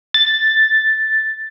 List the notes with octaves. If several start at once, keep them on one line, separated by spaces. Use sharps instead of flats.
A6